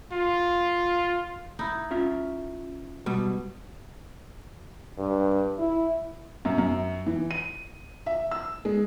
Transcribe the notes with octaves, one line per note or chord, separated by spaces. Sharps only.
F4
D#4 E4
C#4 F4 E5
B2 G3
G2
E4
F#2
F#2
E3
D#7
E5
E6
G#3